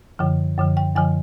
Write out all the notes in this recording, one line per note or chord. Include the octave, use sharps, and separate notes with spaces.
F#2 D3 F3
F#2 D3 F3
G5
F#2 D3 F3 G#5